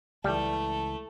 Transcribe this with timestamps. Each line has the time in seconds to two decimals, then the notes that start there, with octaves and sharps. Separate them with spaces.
0.24 C#2 E3 G3 A3 A4